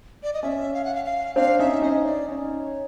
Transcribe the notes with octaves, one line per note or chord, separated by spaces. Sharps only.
D5
D#5
C#4 E5
F5
F#5
F5
F5
C4 D4 F5
C#4 D#4 E5
C#4 D#4 D#5
D5
C#4 D#4 C#5